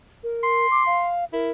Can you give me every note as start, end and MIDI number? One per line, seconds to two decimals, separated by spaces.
0.23 0.67 70
0.43 1.09 84
0.71 0.83 86
0.86 1.25 77
1.33 1.51 64
1.33 1.52 70